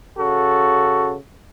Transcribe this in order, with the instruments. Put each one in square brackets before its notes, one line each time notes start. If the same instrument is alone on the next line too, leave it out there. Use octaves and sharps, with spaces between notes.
[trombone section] C#3 F#4 A4